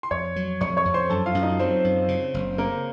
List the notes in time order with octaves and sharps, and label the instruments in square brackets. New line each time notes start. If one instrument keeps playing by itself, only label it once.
[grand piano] C6
[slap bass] F2 [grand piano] C#5 C#6
[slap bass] F#3
[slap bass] F2 [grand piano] C#5 C#6
[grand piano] C#5 C#6
[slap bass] F2
[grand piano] C5 C6
[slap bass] F#2 [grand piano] A4 A5
[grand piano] F4 F5
[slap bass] F#2
[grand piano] D#4 D#5
[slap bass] F#3 [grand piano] C4 C5
[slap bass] F#2
C#3
F#1
[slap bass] C#3 [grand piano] A#3 A#4